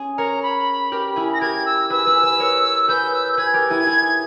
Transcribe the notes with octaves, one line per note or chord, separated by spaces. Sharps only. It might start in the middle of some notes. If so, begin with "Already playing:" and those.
Already playing: C#4 G#4
A#4 C#5 A#5
B5
G4 A#4
E4 G#4
A#6
G4 A#4 G#6
E6
G#4 B4 E6
G#4 B4
G#4 B4
A#4 C#5
E6
G#4 B4 G6
E6
G6
G#4 B4 G#6
G4 A#4
E4 G#4
E4 G#4